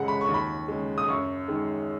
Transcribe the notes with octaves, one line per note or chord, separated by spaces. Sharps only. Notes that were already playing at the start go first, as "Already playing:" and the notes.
Already playing: F#2 C#3 G#3 F#5
B5
C#6
D#2
B5
C#3 G#3
D#6
F#2 C#6
D#3 G#3